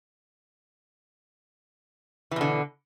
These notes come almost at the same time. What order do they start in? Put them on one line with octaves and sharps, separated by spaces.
E3 B2 D3